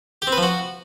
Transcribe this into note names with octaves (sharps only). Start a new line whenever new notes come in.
G4
C4
B4
F3
F#4